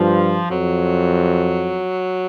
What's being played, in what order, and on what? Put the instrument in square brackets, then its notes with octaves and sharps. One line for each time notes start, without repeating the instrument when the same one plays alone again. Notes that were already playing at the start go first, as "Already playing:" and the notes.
Already playing: [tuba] G2 [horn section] F3
[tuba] F2 [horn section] F#3